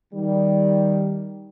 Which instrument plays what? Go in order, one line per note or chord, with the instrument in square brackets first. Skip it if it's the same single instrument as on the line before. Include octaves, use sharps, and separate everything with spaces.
[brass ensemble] D#3 G3